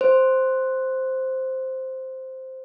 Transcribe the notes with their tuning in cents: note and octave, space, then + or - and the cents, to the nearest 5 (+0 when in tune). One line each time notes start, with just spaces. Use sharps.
C5 +0